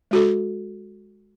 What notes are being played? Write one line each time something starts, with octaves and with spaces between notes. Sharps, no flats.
G#3 F#4 A4